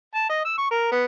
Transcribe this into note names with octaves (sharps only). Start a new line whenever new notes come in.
A5
D#5
E6
C#6
A#4
B3